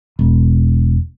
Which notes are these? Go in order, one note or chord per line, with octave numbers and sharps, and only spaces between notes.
E1